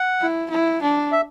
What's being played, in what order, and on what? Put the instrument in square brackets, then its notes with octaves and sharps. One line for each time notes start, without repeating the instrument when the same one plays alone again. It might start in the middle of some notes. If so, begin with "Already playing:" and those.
Already playing: [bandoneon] F#5
[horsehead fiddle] E4
E4
D4
[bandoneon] E5